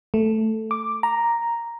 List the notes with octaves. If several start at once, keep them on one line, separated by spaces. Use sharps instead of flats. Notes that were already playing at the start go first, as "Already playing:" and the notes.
A3
D6
A#5